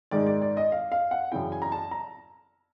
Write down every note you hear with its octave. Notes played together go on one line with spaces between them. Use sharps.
G#2 D#3 G#3 D5
D5
D5
D#5
F5
F5
F#5
F#2 C#3 E3 G5
G#5
A#5
A5
A#5